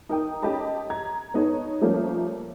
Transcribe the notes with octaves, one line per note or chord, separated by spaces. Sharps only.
D#4 A#4 G5 D#6
C#4 G4 A4 D#5 A5 B5
A#5 G#6
B3 D#4 A4 C#5
F3 G3 A3 A#3 C#4